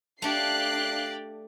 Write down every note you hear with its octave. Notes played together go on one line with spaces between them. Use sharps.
A3 D4 G4 D5 F5 F#6 C7